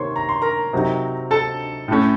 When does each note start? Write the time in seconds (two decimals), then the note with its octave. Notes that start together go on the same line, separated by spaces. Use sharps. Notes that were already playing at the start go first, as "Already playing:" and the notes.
Already playing: C3 D#3 A#3 C5 C#5 C6
0.16 A#5
0.29 C6
0.42 A#4 A#5
0.73 C3 F#3 C4 D#4
1.31 A4 A5
1.88 A2 A3 C#4